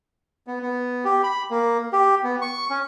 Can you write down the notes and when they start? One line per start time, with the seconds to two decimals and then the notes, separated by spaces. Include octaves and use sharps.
0.47 B3
0.62 B3
1.05 G4
1.24 B5
1.51 A#3
1.93 G4
2.24 B3
2.42 C#6
2.70 C#4